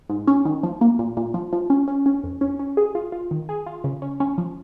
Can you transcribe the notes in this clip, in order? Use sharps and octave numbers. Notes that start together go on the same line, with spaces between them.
G#2
C#4
D#3
F3
A#3
A#2
A#2
F3
F3
C#4
C#4
C#4
F2
C#4
C#4
G#4
F4
F4
D#3
G#4
F4
C#3
C#4
C#4
F3